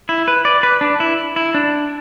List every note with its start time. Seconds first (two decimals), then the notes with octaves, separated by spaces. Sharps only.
0.09 E4
0.28 B4
0.45 D5
0.63 B4
0.81 D4
1.00 E4
1.36 E4
1.54 D4